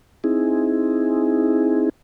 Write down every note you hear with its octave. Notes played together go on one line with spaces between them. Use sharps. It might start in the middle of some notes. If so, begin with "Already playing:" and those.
C4 D#4 E4 G#4